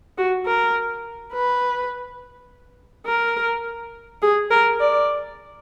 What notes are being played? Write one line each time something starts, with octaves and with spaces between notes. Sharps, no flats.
F#4
A#4
B4
A#4
G#4
A#4
D5